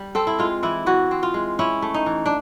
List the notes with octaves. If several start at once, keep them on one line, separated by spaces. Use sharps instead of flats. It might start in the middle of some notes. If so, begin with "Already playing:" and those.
Already playing: G3
C4 A4
E4
G#3 F4
E3 E4
E3 F#4
C4
F4
G#3
C#4 E4
A3
D#4
E3
D4